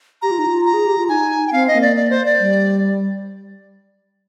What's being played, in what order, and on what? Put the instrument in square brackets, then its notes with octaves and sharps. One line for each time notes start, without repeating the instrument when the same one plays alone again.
[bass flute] G4 [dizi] A#5
[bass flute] F4
D#4
F4
[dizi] A#5
[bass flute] G#4
G4
F4
[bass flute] D#4 [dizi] G#5
[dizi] G5
[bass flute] C4 [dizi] F5
[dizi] D#5
[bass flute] A#3
[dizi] D5
D5
C5
D5
[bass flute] G3